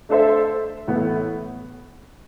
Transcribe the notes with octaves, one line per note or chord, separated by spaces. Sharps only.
A3 D4 A4 C5 E5
A2 E3 B3 E4